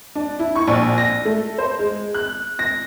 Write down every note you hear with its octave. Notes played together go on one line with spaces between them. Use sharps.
D4
E4
C#6
A#1
A#6
A3
C5
G#3
F#6
A#6